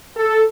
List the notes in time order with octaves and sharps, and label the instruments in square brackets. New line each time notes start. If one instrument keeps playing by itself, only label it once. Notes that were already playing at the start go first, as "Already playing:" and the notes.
[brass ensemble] A4